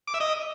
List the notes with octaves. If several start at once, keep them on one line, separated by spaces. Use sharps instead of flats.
D6
E5
D#5